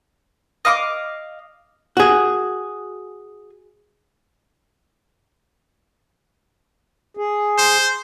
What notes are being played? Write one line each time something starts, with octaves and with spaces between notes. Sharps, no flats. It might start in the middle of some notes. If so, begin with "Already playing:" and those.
D#5 F5 C#6 D6
F#4 G#4
G#4
C5